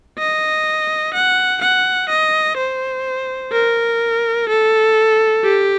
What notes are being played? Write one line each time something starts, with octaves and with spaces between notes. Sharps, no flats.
D#5
F#5
F#5
D#5
C5
A#4
A4
G4